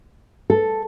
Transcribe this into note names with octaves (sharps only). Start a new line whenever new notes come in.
A4